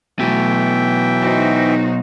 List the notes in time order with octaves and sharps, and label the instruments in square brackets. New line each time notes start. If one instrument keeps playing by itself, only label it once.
[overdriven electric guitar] B2 F#3 [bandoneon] E3 E5 G5 [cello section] A3
[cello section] D#4 F#4 C5